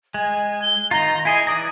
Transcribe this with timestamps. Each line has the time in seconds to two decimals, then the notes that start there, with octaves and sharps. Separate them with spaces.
0.14 G#3 G#5
0.62 G7
0.91 D#3 D#4 F4 A#5
1.25 E4 G#4 D#5 G#5
1.47 E3 D5 A#5 D#6